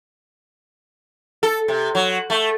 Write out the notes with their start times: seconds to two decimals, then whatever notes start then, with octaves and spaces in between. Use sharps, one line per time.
1.43 A4
1.68 C3
1.95 F#3
2.30 A3